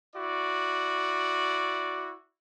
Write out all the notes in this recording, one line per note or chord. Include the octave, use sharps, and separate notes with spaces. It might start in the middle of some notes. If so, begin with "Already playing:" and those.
E4 F#4 D5